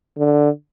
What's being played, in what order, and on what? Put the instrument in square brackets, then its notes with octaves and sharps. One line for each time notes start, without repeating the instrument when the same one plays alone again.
[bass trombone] D3